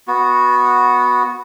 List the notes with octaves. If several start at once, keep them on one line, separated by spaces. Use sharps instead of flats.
B3 F#4